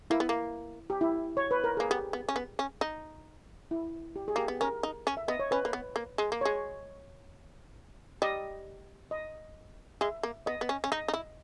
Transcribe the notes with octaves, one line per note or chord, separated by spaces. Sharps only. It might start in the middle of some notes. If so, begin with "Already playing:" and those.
A#3 E4
B3
A#3
G4
E4
C#5
B4
A#4
A#3 G#4
B3 G4
B3
C#4
B3
C#4
D#4
E4
G4
G#4
A#3 G4
B3
C#4 A#4
D#4
C#4
E5
B3 D#5
C#5
C#4 B4
A#3
B3
A#3
G#3
A#3
G#3 C#5
G3 D#5
D#5
G#3 E5
A#3
B3 D#5
B3
C#4
C#4
D#4 D#5
D#4
E4